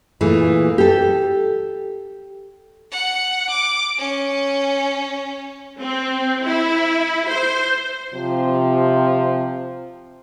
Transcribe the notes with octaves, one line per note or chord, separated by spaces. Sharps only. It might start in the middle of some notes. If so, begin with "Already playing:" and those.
A#2 E3 A3 G#4
G4 A4
F#5
D6
C#4
C4
E4
C5
C3 F3